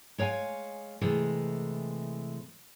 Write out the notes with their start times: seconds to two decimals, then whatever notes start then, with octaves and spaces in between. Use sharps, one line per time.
0.18 G#3 C#5 F5 G5 G#5
1.01 C3 E3 G#3 A3